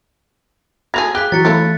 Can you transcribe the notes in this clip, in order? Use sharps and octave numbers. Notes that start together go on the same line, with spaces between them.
A3 F#4 G#4 G#6 A#6 F7
G4 G#4 F5 F#6 B6 G7
E3 F#3 A6 C#7
A3 E4 A4 C#5 F5